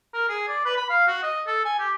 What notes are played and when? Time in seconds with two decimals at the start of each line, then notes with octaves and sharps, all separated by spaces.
0.14 A#4
0.29 G#4
0.48 D5
0.65 B4
0.77 B5
0.90 F5
1.07 F#4
1.23 D#5
1.47 A4
1.65 G#5
1.79 G4